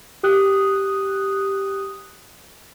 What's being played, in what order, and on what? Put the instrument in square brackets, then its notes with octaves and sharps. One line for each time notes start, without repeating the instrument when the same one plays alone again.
[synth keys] G4 D#6 F#6